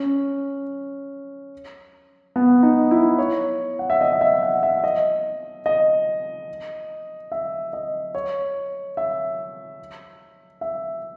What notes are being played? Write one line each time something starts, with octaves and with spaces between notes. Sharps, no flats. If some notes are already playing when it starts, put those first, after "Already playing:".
Already playing: C#4
B3
D#4
E4
C#5
F#5
E5
D#5
D#5
E5
F#5
E5
D#5
D#5
E5
D#5
C#5
E5
E5